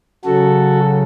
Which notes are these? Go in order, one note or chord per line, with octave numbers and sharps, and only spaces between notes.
C#3 F#3 F#4 A4